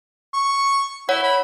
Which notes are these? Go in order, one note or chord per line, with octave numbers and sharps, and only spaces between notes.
C#6
E4 C#5 F#5
B5